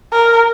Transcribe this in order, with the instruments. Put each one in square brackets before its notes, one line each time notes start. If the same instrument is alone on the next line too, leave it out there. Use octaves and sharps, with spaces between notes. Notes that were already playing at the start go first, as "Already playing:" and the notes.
[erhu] A#4